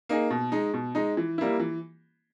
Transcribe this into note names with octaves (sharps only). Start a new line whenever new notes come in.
A#3 D#4 G#4
B2
G#3 D#4
B2
G#3 D#4
E3
G3 A#3 E4
E3